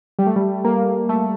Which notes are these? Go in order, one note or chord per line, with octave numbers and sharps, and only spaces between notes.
G3
A3
G3
A#3
A3